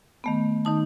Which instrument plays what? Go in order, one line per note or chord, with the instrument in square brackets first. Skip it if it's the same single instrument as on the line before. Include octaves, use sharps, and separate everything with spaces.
[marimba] D#3 A3 B3
D#3 D#4 A5